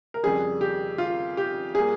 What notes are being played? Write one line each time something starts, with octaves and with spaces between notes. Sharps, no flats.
A#4
F2 C#3 G3 G#4
G4
F4
G4
A#2 G3 A#3 G#4